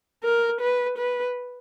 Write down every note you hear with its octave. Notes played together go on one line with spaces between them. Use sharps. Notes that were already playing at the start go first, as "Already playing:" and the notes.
A#4
B4
B4